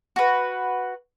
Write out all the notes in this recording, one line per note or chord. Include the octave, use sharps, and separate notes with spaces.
F#4 B4